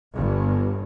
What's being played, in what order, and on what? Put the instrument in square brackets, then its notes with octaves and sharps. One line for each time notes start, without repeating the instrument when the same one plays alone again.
[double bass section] G1 G2